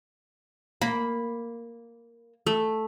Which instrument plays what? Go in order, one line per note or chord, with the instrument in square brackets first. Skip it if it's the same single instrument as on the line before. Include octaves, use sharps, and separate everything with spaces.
[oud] A#3 [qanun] B5
[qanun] A3